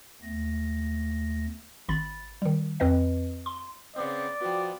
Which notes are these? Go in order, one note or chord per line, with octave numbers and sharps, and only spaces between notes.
D#2 A3 B3 A#6
G#1 B5 A6
D#3 G3
F2 C4 B4 D#5
C6
C#3 B3 C4 D5
F3 B3 F#4 G5